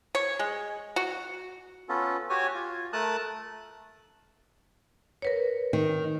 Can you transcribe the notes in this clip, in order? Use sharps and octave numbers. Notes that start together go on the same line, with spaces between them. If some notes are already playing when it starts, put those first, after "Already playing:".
C#5
G#3
F#4
B3 C#4 F4 A4
F#4 G4 C#5 G#5
F4
A3 A#4 A5 D#6 F#6
A#4 B4 C#5
D#3